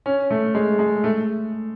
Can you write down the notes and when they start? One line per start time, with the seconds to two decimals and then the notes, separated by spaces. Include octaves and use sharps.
0.06 C#4
0.30 A3
0.55 G#3
0.79 G#3
1.04 A3